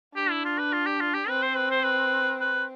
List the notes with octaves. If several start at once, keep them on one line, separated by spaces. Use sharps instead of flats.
D4 G4
E4
F4
B4
F4
G4
F4
G4
C4 B4
C5
B4
C5
B4
B4